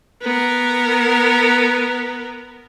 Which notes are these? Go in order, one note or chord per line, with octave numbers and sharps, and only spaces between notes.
B3 A#4